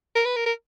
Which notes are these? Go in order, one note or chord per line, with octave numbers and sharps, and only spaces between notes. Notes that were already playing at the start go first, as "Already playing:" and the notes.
A#4
B4
A#4
A#4